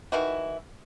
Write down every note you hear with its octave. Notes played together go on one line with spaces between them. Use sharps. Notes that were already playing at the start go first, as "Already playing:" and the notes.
D#3 E3 E4 F#4